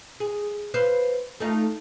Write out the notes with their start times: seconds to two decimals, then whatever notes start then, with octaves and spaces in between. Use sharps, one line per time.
0.20 G#4
0.74 B4 C5 F5
1.40 A3 D#4 F4